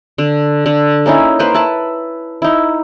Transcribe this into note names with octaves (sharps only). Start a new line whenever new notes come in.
D3
D3
A#3 C#4 D#4 E4
A#3 B4 C5
E4 B4 A5
D#4 E4